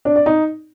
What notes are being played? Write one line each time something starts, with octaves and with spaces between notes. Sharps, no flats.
D4
D5
D#4